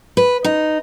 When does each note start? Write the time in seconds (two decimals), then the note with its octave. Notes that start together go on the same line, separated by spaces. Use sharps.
0.17 B4
0.44 D#4